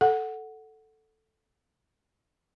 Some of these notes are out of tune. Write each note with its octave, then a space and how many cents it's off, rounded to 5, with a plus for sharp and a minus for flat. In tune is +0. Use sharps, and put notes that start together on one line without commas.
A4 +0 F#5 +0